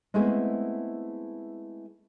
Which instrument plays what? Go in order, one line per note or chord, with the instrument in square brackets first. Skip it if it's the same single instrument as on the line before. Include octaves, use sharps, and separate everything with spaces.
[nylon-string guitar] G#3 A3 B3 C4 E4 G#4